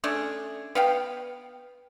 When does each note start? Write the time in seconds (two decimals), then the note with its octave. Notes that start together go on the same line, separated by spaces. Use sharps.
0.04 A3 C#4 D4 G#4
0.75 B3 F5 G5